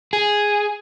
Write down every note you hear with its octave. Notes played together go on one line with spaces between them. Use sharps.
G#4